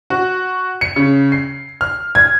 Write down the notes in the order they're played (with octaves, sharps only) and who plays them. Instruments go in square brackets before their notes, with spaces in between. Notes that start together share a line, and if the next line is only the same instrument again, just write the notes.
[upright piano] F#4
C#7
C#3
C7
F6
G#6